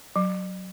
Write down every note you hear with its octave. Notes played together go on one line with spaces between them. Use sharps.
F#3